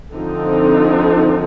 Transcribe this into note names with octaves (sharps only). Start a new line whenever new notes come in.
D3 F3 C4 D#4